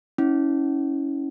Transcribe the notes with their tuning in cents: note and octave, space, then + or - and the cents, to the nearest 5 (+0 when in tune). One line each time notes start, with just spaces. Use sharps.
C#4 +0 E4 -30